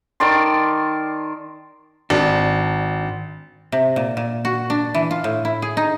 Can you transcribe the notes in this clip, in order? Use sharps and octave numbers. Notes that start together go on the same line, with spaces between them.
D#3 D5 A5 C6
G#1 D4
C3
A#2
A#2
F#4
D4
E3
F4
A2
E4
G#4
D#4